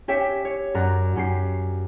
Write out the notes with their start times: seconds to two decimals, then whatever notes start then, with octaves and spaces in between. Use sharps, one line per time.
0.08 C#4 G4 C#5 E5 G5
0.45 C#5
0.74 F#2 D5 A#5 F#6
1.16 F#2 C#4 G4 C7